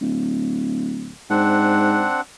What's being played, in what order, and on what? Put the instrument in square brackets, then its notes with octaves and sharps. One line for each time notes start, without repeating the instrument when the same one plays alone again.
[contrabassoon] D1
[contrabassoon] G#2 [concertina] C4 D4 F#5